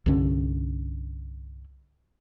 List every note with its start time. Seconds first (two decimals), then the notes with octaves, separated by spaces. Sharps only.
0.06 C2 G2 D3 C#4